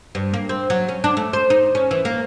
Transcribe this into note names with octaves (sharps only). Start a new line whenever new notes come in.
G2
A#3
C4
F#3
C#4
D4
A3
C5
D#4
C#4
E3
A#3